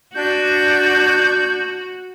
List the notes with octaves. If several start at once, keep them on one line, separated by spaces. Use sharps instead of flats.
D4 F#4 G6